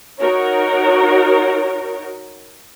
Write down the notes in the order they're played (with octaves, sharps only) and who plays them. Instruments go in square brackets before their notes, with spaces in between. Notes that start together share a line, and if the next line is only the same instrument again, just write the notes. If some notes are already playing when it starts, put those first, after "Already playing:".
[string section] D#4 F#4 A#4 C#5